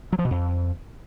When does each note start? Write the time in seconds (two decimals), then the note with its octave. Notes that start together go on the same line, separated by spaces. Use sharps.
0.12 F#3
0.19 F3
0.25 B2
0.31 F2